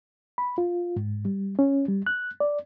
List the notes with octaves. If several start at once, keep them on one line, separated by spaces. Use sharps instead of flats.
B5
F4
G#2
G3
C#4
G3
F#6
D5